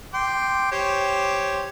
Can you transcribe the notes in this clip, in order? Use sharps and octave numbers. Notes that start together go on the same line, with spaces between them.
G5 C6 D6
G4 C5 C#5